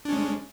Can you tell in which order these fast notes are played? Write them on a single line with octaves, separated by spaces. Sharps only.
D4 C#4 G#3